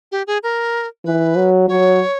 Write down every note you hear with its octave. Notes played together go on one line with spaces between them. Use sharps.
G4
G#4
A#4
E3 B4
F#3
F#3 C#5